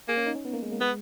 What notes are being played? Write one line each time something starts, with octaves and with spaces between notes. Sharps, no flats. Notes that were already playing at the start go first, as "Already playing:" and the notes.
A#3 G#4
C#4
D#4
C#4
B3
A#3
G#3
A#3
G#3 B3